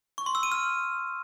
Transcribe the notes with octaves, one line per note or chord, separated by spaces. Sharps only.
C#6
C6
E6
D#7
F6